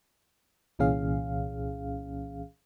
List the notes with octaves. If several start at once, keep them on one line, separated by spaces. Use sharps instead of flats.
C2 A#2 E3 C#4 G#4 F5